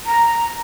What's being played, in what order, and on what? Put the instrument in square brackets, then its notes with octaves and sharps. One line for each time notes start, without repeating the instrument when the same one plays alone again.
[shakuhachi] A#5